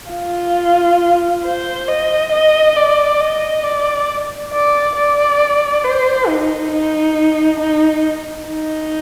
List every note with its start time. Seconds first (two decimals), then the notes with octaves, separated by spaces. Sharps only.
0.12 F4
1.45 C5
1.88 D#5
2.32 D#5
2.76 D5
3.21 D#5
3.64 D5
4.52 D5
4.96 D5
5.84 C5
6.27 D#4
6.72 D#4
7.60 D#4
8.48 D#4